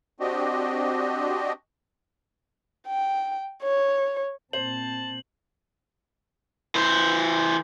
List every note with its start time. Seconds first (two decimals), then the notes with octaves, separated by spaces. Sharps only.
0.20 C4 D4 F#4 G4 D#5
2.87 G5
3.63 C#5
4.53 A#2 C4 C5 A5 F#7
6.75 E3 C5